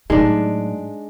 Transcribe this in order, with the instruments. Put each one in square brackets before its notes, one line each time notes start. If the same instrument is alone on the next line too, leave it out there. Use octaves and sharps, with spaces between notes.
[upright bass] A2 F#3 [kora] G#3 D4 [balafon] D#4